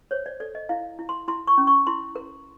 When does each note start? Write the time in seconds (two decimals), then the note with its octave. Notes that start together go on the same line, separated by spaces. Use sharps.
0.11 C5 C#5
0.26 D5
0.40 A4 D5
0.55 D#5
0.69 E4 F5
0.99 E4
1.09 C6
1.28 E4 C6
1.47 C#6
1.58 C#4
1.67 C#6
1.87 E4 C6
2.16 A#4